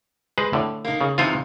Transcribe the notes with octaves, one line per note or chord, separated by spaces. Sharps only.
G#3 B4 C5
A2 D3
A#3 D#4
C#3
E2 C3 D#4 F4 C5 G#5